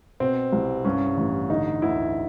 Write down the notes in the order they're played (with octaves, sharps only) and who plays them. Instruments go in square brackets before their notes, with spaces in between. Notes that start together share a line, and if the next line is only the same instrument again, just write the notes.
[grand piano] B2 C4
C2
G2 C#4
A1
D3 D#4
D2 E4